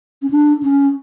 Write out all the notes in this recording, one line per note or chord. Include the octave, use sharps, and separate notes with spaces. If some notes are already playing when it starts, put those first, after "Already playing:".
C#4
D4
C#4